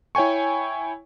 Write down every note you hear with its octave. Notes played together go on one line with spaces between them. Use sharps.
E4 C#5 G5 G#5 C#6